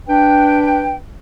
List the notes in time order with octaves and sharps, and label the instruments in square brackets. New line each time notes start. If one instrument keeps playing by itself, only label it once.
[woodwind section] D4 B4 G5